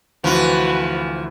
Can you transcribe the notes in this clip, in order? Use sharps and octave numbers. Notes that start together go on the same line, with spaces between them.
D2 E3 F3 F4 F#4 B4